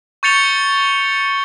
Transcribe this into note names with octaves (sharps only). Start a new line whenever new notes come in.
C#6 G6 A6 C#7 F7 G7